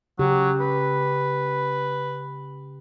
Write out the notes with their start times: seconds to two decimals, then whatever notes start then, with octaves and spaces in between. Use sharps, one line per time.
0.19 C#3 F#3 G4
0.60 B4